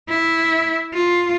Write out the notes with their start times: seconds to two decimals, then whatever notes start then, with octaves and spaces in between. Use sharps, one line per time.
0.09 E4
0.94 F4